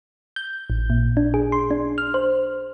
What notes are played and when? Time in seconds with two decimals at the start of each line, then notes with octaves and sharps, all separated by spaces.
0.36 G6
0.70 A1
0.90 A#2
1.17 D4
1.34 G#4
1.52 C6
1.71 D4
1.98 F6
2.14 C5